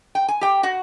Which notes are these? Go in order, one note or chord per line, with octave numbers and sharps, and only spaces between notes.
G5
G#5
G4 G5
F#4 F#5